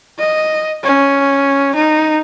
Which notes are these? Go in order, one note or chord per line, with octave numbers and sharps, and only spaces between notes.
D#5
C#4
D#4